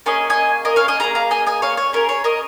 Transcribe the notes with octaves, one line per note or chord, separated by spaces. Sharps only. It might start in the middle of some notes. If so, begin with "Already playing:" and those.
A#3 C#4 G#4 D#5 G#5
D#5 G#5
A#4 D#5
C#5 F5
D#5 G#5
A#3 C#4 G#4 F5 A#5
F5 A#5
D#5 G#5
D#5 G#5
C#5 F5
C#5
C#4 G#4 A#4
C#5
A#4 D#5